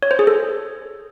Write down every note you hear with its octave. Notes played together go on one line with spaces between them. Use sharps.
C#5
C5
G#4
A4